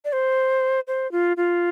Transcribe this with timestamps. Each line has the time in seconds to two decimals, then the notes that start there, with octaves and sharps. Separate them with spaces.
0.05 D5
0.13 C5
0.88 C5
1.12 F4
1.37 F4